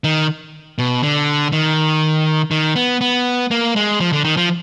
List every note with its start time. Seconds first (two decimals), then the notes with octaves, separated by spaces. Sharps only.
0.04 D#3
0.79 B2
1.03 D3
1.52 D#3
2.51 D#3
2.76 B3
3.01 B3
3.51 A#3
3.76 G#3
4.00 F3
4.12 D3
4.24 D#3
4.37 F3